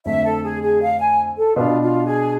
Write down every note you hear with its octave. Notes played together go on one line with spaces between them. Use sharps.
F2 D3 A3 E5
A4
G#4
G#4
F5
G#5
A4
B2 B3 D4 F4
F4
G#4